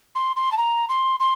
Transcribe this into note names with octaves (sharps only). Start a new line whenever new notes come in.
C6
C6
A5
A#5
C6
C6